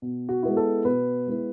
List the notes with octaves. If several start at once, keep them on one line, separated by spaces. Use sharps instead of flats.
B2
F#4
G#3 B3 E4
A4
B2 B4
G#3 B3 E4